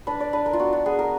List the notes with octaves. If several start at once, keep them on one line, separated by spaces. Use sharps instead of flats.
D4 B4
D5
D4 B4
A#4
F4
B3 F#4
F#4
B3 G#4
A#4